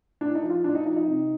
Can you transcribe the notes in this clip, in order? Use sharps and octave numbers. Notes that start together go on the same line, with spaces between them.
A2 D4
D#4
F3
F4
A2 D4
D#4
F3 D#4
D#4
C3